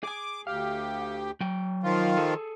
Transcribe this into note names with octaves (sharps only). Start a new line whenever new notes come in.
G#4 G#5 D6
D2 G4 F5
F#3 G5
D#3 F3 F4
G#4 A4